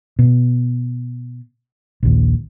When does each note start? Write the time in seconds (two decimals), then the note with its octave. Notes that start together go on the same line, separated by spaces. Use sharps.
0.19 B2
2.03 A#1 D#2